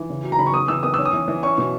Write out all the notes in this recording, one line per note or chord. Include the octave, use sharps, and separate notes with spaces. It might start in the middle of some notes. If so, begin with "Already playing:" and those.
Already playing: E3
C#3
F#3
A#5
C#3 B5
C#6
B3 D#6
E3 E6
B3 D#6
C#4 E6
D#6
E3
E3
C#4 C#6
B2